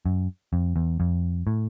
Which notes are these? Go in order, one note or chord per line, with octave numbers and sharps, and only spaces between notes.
F#2
F2
E2
F2
A2